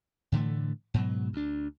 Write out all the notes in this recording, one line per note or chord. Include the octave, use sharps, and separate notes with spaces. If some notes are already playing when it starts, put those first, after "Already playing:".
A2 D3 E3 A3
G#2 B2 F#3
D2 D4